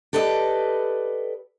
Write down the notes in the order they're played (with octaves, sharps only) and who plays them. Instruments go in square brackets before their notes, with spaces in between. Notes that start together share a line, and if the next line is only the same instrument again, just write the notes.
[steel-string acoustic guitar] G4 A4 B4 D5 D#5